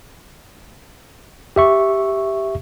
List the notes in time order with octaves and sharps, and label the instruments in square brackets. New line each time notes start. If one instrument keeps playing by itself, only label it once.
[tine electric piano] G4 E5 C#6